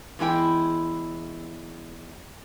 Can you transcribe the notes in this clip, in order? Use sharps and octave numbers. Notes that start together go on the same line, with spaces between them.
E2 G#3 E4 G5